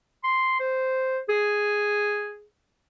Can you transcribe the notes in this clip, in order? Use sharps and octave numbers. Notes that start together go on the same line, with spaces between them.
C6
C5
G#4